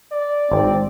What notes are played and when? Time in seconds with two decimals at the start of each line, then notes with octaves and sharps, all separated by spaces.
0.12 D5
0.52 G#1 C4